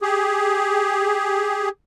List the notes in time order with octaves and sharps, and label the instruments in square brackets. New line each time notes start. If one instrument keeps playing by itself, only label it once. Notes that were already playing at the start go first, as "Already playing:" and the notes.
[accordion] G4 G#4